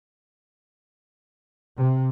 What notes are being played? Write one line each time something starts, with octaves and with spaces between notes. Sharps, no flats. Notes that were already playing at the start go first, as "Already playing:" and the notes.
C3